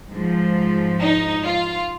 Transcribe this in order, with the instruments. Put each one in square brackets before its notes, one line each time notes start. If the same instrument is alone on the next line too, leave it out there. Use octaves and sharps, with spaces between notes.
[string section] G#2 F3
D#4
F4